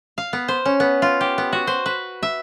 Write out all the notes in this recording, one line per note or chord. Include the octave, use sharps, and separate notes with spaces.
F5
B3
C5
C#4
B3
F4
G4
B3
F#4
C5
B4
E5